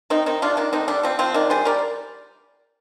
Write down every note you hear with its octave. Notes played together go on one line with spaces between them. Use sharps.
D#3 C4 D#4
D#3 C4 D#4
C3 D4 F4
D#3 D4
D3 C4 D#4
G3 D4
F3 C4
F3 C4
D#3 D4
G3 G#4 C5
G3 A#4 D5